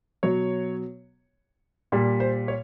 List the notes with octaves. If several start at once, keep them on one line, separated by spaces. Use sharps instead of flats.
B2 F#3 C#5
A#2 G3
C5
C#5